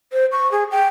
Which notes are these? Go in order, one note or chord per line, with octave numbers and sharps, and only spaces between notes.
C5
C#6
G#4
G5